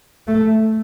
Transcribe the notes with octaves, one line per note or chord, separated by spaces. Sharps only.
A3